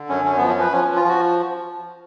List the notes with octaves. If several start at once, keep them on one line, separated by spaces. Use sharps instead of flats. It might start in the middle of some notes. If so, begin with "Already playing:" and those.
Already playing: D3
F#2 C#4
F#2 C#4
F3 B3
C#4
F3 B4
F3 C#4
F3 C#4
F4
F3 F#4